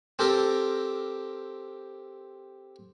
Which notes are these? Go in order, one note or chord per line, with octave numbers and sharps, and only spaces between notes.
C4 G4 A4 A#4